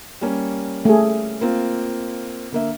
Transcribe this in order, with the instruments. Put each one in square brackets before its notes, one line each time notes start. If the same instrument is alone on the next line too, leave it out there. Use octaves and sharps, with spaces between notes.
[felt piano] G3 A#3 C#4
[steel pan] A3 G#4
[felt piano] A#3 C4 F4
D3 A#3 E5